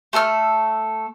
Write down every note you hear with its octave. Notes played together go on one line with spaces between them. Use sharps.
A3 A4 E6 F6